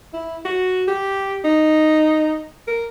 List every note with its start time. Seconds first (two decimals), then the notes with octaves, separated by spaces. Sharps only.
0.13 E4
0.45 F#4
0.88 G4
1.44 D#4
2.67 A#4